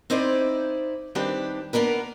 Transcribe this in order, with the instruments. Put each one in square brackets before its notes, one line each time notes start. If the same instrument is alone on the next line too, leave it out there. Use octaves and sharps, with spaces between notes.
[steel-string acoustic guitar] C4 D#4 E4 C5 D5
D#3 G3 C4 D4 G4 B4
A#3 B3 D4 A#4 B4